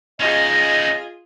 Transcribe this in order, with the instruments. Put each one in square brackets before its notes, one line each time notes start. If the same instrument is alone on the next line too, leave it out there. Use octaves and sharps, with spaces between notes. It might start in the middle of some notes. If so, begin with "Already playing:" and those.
[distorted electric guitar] C#4 D#4 [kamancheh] F4 G#4 [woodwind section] D#5